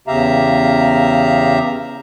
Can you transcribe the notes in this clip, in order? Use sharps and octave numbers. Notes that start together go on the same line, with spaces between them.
E2 C#3 G4 E5 F5 A#5